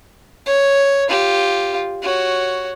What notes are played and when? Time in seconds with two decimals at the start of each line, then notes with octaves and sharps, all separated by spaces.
0.46 C#5
1.08 F4 G4
2.02 F#4 C#5